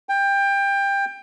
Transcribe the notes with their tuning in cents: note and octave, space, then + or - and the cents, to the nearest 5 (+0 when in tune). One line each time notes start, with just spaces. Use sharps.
G5 +20